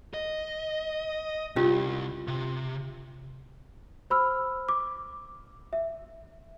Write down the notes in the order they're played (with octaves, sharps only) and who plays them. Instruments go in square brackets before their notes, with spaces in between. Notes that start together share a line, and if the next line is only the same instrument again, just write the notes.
[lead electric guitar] D#5
[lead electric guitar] C2 [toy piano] C#4 F4 G4
[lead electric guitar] C3
[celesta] C5 B5 E6 F6
D6
E5